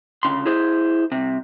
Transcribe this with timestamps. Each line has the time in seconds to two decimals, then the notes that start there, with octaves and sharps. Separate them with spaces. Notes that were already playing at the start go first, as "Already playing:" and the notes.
0.23 D2 C#3 C6
0.46 E4 G#4 C5
1.12 C2 C3